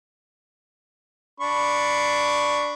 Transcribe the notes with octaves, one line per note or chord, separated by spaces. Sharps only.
D4 B5 C#6